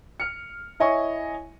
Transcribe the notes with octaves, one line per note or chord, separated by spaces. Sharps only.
F6 C#7
E4 C#5 D#5 E5 G#5 C#6